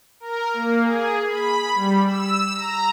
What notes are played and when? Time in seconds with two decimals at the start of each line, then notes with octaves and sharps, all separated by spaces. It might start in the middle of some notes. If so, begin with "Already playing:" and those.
0.20 A#4
0.54 A#3
0.84 G#4
1.29 B5
1.74 G3
2.07 E6
2.55 A#5